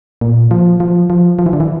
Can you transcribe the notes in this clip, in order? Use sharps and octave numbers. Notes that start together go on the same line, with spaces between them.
A#2
F3
F3
F3
F3
E3
D3
E3